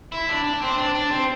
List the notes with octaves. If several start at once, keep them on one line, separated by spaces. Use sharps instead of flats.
E4
D4
D4
C4
D4
D4
C4